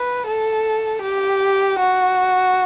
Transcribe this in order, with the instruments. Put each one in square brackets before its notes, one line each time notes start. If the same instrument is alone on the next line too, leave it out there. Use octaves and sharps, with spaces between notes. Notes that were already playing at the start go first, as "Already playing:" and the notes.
Already playing: [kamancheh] B4
A4
G4
F#4